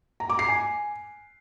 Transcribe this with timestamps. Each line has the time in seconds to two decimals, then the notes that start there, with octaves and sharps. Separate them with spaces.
0.20 A#5
0.29 D6
0.39 C7
0.48 G#5